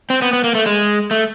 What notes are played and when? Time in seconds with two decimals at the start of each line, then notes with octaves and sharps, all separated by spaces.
0.10 C4
0.22 B3
0.33 B3
0.44 A#3
0.55 A3
0.66 G#3
1.11 A3